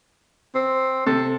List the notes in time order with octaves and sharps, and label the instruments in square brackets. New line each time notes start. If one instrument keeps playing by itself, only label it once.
[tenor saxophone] C4
[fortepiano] C3 [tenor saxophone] A4